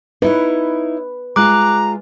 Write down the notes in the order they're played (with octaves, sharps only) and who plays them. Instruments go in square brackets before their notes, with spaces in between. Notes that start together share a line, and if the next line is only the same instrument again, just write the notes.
[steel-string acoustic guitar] D#4 E4 C#5 [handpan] B4
[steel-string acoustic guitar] G#3 F4 [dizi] A#5 [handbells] D6 F#6